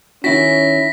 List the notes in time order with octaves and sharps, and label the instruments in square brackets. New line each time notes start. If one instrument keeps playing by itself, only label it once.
[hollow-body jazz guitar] D#3 E4 F#4 [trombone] C#4 [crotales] A#6 B6